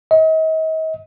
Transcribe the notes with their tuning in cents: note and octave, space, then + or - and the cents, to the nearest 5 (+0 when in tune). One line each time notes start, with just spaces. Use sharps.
D#5 +40